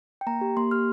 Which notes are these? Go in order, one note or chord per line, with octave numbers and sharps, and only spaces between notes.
G5
A#3 A#5
G4
A#3 C6
G4 F6